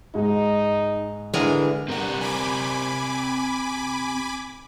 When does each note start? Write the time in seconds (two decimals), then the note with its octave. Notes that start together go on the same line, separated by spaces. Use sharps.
0.15 G#2 D#4
1.34 D3 E3 G#3 A#4
1.88 G2 C4 G4 A#4 F#5
2.21 G#5 B5 D6